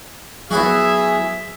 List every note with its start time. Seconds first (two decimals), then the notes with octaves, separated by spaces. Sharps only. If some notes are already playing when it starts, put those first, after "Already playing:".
0.51 F#3 B3 E4 F#4 G#4 E5